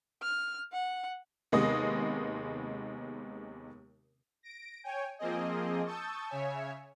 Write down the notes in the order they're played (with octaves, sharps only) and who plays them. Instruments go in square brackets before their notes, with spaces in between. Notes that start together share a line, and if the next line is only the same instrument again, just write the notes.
[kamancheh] F6
F#5
[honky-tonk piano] D#2 C3 G#3 B3 D#5 D#6
[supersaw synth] A#6 D7
C#5 G5 G#5
F3 A#3 C4 G#4 D#5
A5 C#6 D#6 E6 G6 A6
C#3 C#5 E5 G#5